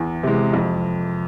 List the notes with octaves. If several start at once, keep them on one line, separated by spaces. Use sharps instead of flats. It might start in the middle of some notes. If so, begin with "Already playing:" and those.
Already playing: E2
C3 E3 G#3
F2